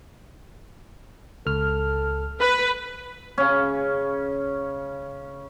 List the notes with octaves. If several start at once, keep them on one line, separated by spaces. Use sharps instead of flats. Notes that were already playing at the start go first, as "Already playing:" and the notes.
C#2 A4 F6
B4
C#3 C#4